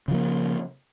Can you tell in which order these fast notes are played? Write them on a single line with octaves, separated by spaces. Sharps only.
C#3 F3 A#3